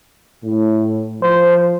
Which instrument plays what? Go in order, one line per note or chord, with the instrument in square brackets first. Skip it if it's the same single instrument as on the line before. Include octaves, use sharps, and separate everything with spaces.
[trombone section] A2
[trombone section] F3 [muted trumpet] C5